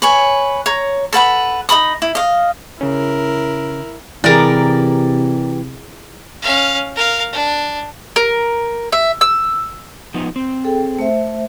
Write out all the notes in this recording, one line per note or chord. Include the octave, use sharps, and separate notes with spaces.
B4 C#5 G#5
C#5 A#5
A4 B4 F#5 B5
D#4 A#4 B5 D#6
E4
D#5 F5
C#3 C#4 E4 A#4
C3 E3 E4 G4 G#4 A#4 D5
C#4 F5
A#4 F5
D4
A#4
E5
E6
F3 B3 D#4
C4
G#4 A4 G5
A3 C5 E5